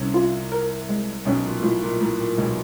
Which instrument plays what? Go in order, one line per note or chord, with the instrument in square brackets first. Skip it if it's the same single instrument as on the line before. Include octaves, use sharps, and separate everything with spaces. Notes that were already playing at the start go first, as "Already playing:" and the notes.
Already playing: [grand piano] C2 C3 [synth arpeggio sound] C#4
[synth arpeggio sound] F4
A#4
G#3
[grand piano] B1 B2 [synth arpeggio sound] C#4
[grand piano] A#2
A#2
[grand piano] A2 [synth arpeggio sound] F4
[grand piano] A#2
[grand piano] A2 [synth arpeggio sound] A#4
[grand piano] A#2
[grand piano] B1 B2 [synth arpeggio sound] G#3